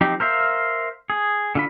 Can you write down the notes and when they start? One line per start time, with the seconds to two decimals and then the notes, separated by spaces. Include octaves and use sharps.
0.01 F3 C4 D#4 G4
0.20 A#4 C5 E5 F5
1.10 G#4
1.55 D3 F4 B5